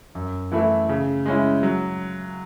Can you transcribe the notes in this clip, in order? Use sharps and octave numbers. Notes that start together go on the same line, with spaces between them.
F#2
E3 A3 E4
C#3
G#3 C#4 E4
F#3